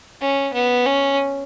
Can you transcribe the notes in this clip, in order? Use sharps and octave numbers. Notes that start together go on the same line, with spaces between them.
C#4
B3
C#4